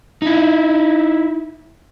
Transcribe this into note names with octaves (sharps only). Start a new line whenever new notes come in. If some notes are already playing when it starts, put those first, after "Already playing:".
D#4 E4